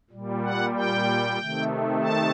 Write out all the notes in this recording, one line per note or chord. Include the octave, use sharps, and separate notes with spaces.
A#2 G3
F#5
G5
C3 D#3 A3
A5